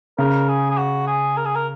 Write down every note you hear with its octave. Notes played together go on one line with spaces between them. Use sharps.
C#3 A#4
G#4
G#4
F#4
G#4
A#4
G#4
A#4